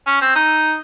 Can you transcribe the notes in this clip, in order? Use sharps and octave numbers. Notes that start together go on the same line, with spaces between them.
C#4
C4
D#4